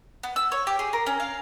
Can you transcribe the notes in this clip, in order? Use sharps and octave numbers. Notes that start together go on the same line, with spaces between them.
B3
E6
C#5
G4
G#4
A#4
C#4
F5